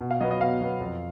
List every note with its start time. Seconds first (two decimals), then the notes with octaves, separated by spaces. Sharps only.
0.01 B2
0.11 F5
0.21 F#3 D#5
0.24 B3
0.31 D#5
0.41 B2 F5
0.61 F#3 B3
0.80 F2